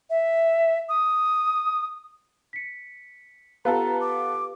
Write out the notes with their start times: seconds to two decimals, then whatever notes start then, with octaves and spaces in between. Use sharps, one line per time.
0.10 E5
0.89 D#6
2.53 B6 C#7
3.65 B3 F4 G4 A4 B4 F5 A#5
4.01 D6